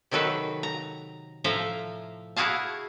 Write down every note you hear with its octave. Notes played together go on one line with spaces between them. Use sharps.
C3 D#3 F#3 A4 B4
A#5
A2 F3 A4 E5 F5 A#5
E4 F#4 G#4 F5 A5